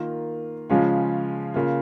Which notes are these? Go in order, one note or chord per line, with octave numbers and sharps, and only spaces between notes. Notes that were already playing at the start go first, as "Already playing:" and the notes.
Already playing: D#3 A#3 F4
C#3 F3 G#3 C#4 F4
C#3 A#3 F4